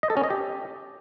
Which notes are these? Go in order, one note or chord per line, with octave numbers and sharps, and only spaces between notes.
D#5
A4
C#4
D#5
G4